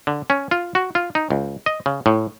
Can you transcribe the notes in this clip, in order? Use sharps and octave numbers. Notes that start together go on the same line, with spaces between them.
D3
C#4
F4
F#4
F4
D#4
C#2
D#5
C#3
A2